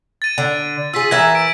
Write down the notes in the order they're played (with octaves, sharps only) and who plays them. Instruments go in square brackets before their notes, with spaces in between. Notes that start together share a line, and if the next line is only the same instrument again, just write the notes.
[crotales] A6 D#7
[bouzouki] D3
[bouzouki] F4 G#4 [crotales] E6 B6
[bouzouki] E3 A#4 E5 [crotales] G#6
[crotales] D7